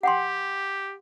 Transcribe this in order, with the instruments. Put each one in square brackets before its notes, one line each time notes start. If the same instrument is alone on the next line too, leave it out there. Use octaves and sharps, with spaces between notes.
[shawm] G4 [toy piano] F#5 G5 C6